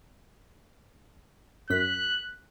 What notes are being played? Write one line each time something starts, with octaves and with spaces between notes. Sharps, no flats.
F#2 F#6 B6